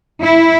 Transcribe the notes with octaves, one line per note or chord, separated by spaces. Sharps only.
E4